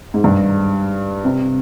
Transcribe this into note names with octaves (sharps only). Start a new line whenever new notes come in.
G#2
G2
C3